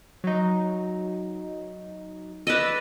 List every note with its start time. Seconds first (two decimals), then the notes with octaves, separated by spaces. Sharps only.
0.24 F#3 D#4
2.47 B4 D5 D#5 E6